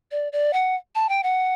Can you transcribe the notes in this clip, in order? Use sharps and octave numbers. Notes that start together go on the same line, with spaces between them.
D5
D5
F#5
A5
G5
F#5